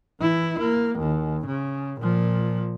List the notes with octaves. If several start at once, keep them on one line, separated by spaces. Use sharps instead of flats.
E3 E4
A#3
D#2
C#3
A#2 F3